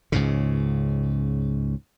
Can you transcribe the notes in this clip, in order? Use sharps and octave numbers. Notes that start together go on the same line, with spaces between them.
C#2 G#2 C#3